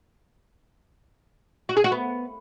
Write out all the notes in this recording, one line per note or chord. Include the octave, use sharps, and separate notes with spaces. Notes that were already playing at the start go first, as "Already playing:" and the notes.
F#4
G#4
F#4
B3